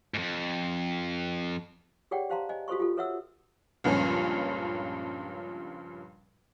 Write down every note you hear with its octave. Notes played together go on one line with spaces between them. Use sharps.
F2 G#2
G4 G#4 C#5 D5 F#5 G5
G4 C5 F5 A5 A#5 C6
C5 D#5 G#5
F#4 G4 A4 C5 C6 C#6
F4 G4 A4
A4 B4 C#5 E5 F#5 E6
C#2 G2 A#2 F3 C#4